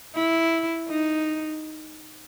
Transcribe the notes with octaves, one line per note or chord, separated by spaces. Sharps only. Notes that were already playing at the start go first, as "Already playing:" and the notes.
E4
D#4